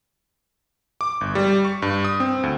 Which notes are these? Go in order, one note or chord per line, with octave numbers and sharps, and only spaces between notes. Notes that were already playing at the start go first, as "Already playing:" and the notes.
D6
G1
G3
C#6
G2
D#6
C4
D2